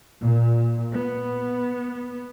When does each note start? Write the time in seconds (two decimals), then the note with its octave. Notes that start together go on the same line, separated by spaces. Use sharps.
0.19 A#2
0.95 B3